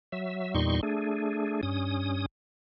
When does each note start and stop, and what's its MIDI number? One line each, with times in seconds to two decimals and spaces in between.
0.12 0.54 54
0.12 0.54 76
0.55 0.81 40
0.55 0.81 46
0.55 0.81 55
0.55 0.81 63
0.55 0.81 84
0.55 0.81 85
0.83 1.61 57
0.83 1.61 62
0.83 1.61 68
1.63 2.26 43
1.63 2.26 61
1.63 2.26 87